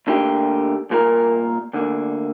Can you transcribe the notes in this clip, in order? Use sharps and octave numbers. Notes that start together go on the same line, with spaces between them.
D2 D3 A#3 G4
C2 A#2 A#3 G4 A#4
D2 D3 A#3